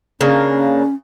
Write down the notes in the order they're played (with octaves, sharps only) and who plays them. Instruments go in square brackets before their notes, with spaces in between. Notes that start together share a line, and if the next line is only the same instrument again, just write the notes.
[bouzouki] C#3 A#3 D4 [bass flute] C#4